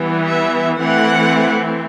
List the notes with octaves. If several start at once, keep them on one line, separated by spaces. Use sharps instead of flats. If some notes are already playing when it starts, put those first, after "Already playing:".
Already playing: E3 G3 B3
E5
E3 A3 C4 F#5